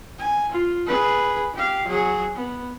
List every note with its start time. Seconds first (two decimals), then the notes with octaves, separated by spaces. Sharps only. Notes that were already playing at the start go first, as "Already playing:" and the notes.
0.19 G#5
0.52 F4
0.86 G#4 B4
1.54 G4 F5
1.88 F#3 G#4
2.35 B3